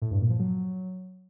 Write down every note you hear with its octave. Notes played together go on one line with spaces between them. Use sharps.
A2
G2
A#2
F3
F#3